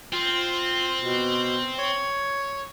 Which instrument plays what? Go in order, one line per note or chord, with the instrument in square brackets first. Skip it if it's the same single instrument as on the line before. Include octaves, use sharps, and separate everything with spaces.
[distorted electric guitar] C4 [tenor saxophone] F4
[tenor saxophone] B2
C#5